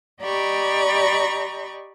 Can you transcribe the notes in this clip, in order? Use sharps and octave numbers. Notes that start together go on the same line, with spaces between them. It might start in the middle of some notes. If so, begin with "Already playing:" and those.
G4 D5 D#5 A#5 B5 C#6